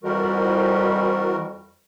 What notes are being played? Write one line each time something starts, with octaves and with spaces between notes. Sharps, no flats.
F2 E3 G3 F#4 A#4